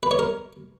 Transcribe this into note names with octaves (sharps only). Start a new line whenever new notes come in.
B4
C#5
A#4